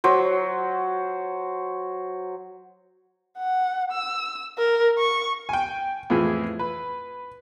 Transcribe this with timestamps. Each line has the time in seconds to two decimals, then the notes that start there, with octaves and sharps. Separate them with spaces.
0.04 F#3 C5
3.38 F#5
3.92 E6
4.58 A#4
4.98 C#6
5.49 G5 G#5
6.10 F2 A2 E3 G#4
6.59 B4